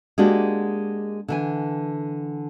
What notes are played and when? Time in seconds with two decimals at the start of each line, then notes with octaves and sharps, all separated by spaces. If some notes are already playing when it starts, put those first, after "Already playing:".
0.18 G#3 A#3 D4 F#4 G4
1.28 D3 E3 G#5